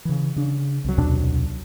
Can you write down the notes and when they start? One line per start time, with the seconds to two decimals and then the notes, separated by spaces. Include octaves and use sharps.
0.05 C#3 E3
0.36 C#3 D4
0.84 C2 F#3
0.98 D#2 B2 D4